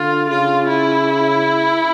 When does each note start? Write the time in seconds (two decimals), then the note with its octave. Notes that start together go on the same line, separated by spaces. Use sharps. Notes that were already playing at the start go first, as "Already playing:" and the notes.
Already playing: D3 F4
0.29 C#3 F4
0.68 E4